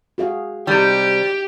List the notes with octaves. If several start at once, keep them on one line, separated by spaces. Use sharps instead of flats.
F#4 G#4 F5
C3 G3 D#4 G4